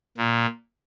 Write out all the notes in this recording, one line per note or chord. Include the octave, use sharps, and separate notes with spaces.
A#2